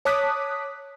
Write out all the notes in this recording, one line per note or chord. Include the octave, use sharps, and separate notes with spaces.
C#5 A5 D6 D#6 F#6 B6